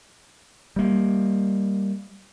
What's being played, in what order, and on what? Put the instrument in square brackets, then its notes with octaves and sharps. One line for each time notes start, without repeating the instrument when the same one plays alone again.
[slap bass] G3 A#3